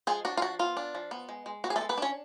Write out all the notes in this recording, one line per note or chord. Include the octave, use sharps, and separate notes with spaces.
F3 G#3 G#4
D4 F#4
F4
F3 F#4
B3 F4
D4
F3
B3
G#3
G#3
B3 F#4
G#4
A3 A4
G#3
B3 B4
C#4 D4 C#5